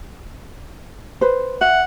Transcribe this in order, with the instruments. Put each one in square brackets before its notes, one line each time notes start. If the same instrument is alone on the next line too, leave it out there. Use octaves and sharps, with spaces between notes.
[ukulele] B4 C5
[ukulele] E5 [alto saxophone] F#5